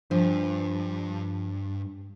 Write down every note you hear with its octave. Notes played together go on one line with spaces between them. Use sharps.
G2 F3 D4